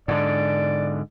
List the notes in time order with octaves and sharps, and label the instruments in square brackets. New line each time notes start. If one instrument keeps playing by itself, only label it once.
[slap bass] G#2 D3 [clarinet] D5